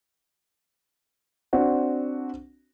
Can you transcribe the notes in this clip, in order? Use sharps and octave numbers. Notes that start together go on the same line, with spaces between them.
C4 D4 F#4